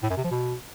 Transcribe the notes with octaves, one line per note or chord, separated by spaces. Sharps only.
A2
F#2
C3
F3
B2